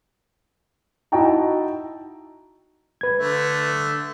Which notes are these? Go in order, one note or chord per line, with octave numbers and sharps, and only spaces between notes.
D#4 E4 F#4 G5 A5 A#5
B4 G#6
D3 A3